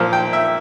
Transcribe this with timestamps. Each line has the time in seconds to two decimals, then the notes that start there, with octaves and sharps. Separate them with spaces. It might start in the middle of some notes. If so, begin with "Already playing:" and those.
Already playing: A#2 F3 A#3
0.13 G5
0.33 E5